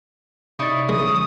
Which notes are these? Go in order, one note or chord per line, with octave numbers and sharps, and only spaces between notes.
C3 D#4 E4 C#5 D5 A6
D3 F3 F#3 G#3 D#6